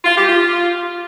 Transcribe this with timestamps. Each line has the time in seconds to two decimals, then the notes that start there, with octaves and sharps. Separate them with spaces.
0.05 F4
0.16 G4
0.27 F4